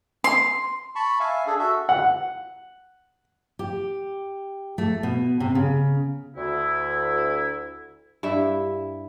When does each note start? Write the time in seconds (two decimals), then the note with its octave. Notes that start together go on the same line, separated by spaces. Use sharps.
0.24 C6
0.95 A5 B5 C#6
1.20 E5 F5 G#5
1.47 D4 G#4 A4
1.59 F#4 A4 E5
1.89 F#5
3.59 G4
4.78 A3
5.03 B2
5.40 C3
5.55 C#3
6.36 D2 E4
8.23 G2 E4 E5